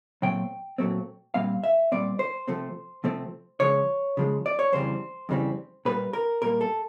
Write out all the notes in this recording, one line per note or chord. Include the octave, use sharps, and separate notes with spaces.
A#2 F#3 A3 C4 G5
A#2 F#3 A3 C4
A#2 G3 C4 F5
E5
A#2 G3 C4 D5
C5
C3 F3 A3 C4
C3 F3 A3 C4
C#3 F3 G#3 C#5
C#3 F3 G#3
D5
C#5
F2 C#3 E3 G3 C4 C5
F2 C#3 E3 G3 C4
A#2 G3 A#3 B4
A#4
A#2 G3 A#3 A#4
A4